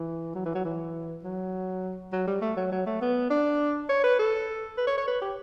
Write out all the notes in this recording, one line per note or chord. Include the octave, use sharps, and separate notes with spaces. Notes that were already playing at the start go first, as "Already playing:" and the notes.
Already playing: E3
F#3
E3
F#3
E3
F#3
F#3
G3
A3
F#3
F#3
A3
B3
D4
C#5
B4
A4
B4
C#5
C#5
B4
G4